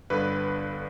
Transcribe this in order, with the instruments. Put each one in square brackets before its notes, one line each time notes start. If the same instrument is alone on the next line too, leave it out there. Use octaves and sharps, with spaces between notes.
[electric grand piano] G1 G2 D3 B4